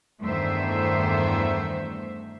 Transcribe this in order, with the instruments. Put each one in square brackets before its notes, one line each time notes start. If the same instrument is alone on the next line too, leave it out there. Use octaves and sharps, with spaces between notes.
[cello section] E2 G2 D#3 A3 C5 E5